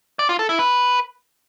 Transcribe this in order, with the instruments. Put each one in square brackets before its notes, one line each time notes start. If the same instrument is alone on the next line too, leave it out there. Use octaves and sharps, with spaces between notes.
[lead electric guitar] D5
F4
A4
E4
B4